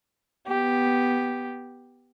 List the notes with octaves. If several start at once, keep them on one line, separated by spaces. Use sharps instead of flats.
B3 G4